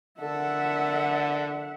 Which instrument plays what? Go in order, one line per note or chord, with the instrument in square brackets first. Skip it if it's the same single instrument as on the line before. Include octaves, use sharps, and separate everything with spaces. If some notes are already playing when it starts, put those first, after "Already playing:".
[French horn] D3 [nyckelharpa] A4 A#4 [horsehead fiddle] E5 F#5